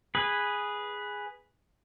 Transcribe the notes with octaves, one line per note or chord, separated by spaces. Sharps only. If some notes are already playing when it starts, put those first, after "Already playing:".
G#4 B4